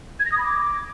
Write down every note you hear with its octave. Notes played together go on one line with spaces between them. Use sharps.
G#6
A#6
D#6
B5
D6